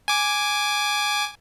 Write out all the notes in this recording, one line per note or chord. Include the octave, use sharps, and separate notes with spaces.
G#5 D6